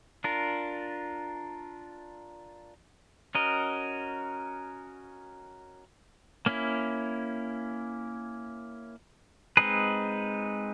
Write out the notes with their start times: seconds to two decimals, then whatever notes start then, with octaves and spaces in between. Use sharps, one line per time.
0.24 D4 F4 A#4
3.35 C#4 F#4 A#4 D#5
6.46 A#3 C#4 E4
9.57 G#3 C4 D#4 G#4 B4